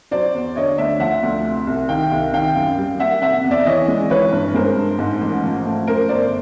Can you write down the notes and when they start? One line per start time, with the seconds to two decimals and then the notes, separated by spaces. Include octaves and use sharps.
0.11 F#3 C5 D5
0.34 E2
0.56 D3 C#5 D#5
0.78 D2 D5 E5
1.00 F3 E5 F#5
1.23 D2
1.45 C3
1.67 C2
1.89 D#3 F5 G5
2.11 C2
2.33 D#3 F5 G5
2.56 F#2
2.78 G3
3.00 A#3 E5 F#5
3.22 C3 E5 F#5
3.44 E2
3.51 D5 E5
3.66 E3 C#5 D#5
3.88 G#3
4.10 E3 B4 C#5
4.32 G2
4.54 G#3 A#4 C5
4.76 G2
4.99 G#2
5.21 A1
5.44 F3
5.65 A3
5.87 F#2 A#4 C5
6.09 G1 C5 D5